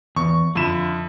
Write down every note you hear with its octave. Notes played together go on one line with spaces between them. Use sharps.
E2 C#6
F2 D3 E4 E7